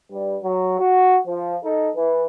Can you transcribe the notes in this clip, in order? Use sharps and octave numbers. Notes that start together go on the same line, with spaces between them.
G2 G3
F#3
F#4
F3
D#4 A4
E3